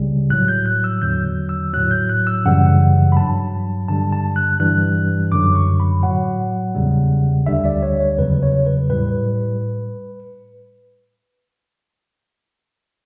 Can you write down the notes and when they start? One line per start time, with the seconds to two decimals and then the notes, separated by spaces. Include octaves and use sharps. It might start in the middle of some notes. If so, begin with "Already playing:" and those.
Already playing: C#2 C#3 G3
0.30 A2 F#3 F#6
0.48 G6
0.66 F#6
0.84 E6
1.02 E2 D3 F#3 G6
1.49 E6
1.73 A2 F#3 F#6
1.91 G6
2.10 F#6
2.27 E6
2.45 F#2 C#3 E3 G3 F#5
3.12 B5
3.16 G2 F#3 A5
3.88 G2 D3 G3 A5
4.13 A5
4.36 F#6
4.59 G2 E3 G3 F#6
5.32 F#2 D3 F#3 D6
5.55 C#6
5.80 B5
6.03 A2 F#3 F#5
6.75 E2 C#3 G3
7.46 D2 D3 G3 E5
7.65 D5
7.83 C#5
8.00 C#5
8.18 E2 C#3 F#3 B4
8.43 C#5
8.66 B4
8.90 A2 G3 B4